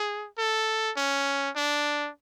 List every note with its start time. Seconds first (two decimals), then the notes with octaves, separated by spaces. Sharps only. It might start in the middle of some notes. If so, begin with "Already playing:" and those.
Already playing: G#4
0.38 A4
0.97 C#4
1.56 D4